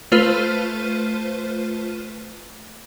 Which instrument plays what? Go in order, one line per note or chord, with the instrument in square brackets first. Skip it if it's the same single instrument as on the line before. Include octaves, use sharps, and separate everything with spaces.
[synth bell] A3 F4 B4 C5 F6 D#7